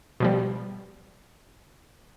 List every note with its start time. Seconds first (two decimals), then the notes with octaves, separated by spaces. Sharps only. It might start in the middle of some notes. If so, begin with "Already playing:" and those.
0.20 B2 F3 G3